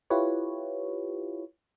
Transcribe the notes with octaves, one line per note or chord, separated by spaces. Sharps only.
E4 F4 G4 B4 C#5